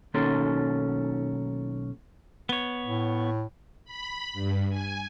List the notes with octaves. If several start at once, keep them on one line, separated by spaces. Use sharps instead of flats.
B1 D#3 A#3 C#4 A4 C6
B3 C#5
A2
B5
G2
G#5